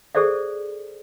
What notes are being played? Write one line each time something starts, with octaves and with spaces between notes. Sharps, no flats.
G#4 A4 C5 D5 E5